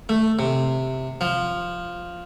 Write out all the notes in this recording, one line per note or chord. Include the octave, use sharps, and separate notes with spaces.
A3
C3
F3